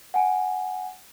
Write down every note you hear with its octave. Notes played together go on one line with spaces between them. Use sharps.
F#5 G#5